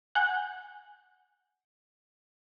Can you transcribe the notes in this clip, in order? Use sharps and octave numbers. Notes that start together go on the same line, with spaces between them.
F#5 G#5 G6